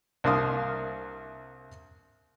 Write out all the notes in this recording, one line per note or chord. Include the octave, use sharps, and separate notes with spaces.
C2 A#3 D4 F5 C6 D#6